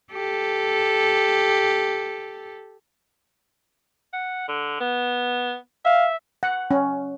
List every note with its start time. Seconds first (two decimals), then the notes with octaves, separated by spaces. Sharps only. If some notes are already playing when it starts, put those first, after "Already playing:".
0.13 G4 A4
4.13 F#5
4.48 D3
4.80 B3
5.85 E5 F5
6.43 F#5
6.71 C#4